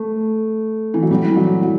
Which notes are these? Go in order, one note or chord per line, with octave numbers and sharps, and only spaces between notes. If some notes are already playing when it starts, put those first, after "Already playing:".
Already playing: A3
E3
F#3
G3
E3
F#3
F#3